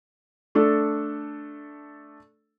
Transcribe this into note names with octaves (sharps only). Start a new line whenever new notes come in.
A3 D4 A4